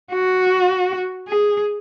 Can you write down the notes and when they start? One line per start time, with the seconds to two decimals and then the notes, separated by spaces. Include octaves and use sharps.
0.12 F#4
1.28 G#4